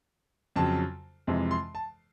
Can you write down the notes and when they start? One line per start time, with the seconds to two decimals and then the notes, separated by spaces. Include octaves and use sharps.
0.56 F2 C#3 F#3 A5
1.27 F2 C3 E3 G#3
1.51 C6
1.75 A5